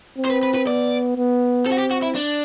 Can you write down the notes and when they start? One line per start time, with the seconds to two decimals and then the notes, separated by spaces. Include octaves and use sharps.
0.18 C4
0.25 C5
0.30 B4
0.43 B4
0.54 B4
0.67 B3 D5
1.16 B3
1.66 C4 A4
1.72 F#4
1.78 G4
1.91 F#4
2.03 E4
2.16 D4